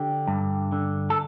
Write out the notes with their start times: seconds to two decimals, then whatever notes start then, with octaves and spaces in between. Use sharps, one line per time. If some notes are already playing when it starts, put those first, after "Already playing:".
Already playing: D3 G4
0.27 G2
0.72 D3
1.10 A4